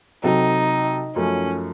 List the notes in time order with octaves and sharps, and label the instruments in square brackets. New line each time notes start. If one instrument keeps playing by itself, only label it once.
[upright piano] C3 F#3 C4 F#4 A4 [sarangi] D#4
[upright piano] F#2 F3 A3 [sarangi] C#4